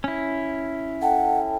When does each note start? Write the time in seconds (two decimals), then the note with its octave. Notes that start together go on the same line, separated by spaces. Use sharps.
0.04 C#4 E4
1.02 A4 F#5 G5 A5